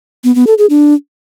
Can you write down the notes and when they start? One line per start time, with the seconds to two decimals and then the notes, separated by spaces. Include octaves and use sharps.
0.24 B3
0.35 B3
0.47 A4
0.58 G#4
0.70 D4